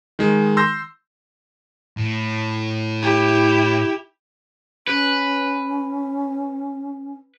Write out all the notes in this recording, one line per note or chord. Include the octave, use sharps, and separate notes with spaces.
D#3 G#3
C6 E6 G6 A#6
A2
E4 G4
C#4 B4